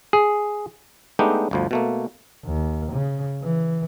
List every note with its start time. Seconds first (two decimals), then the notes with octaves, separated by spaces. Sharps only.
0.13 G#4
1.19 G#3 A3 B3 D4 D#4 G4
1.51 G1 D2 F3
1.71 B2 A3 A#3
2.44 D#2
2.92 C#3
3.42 E3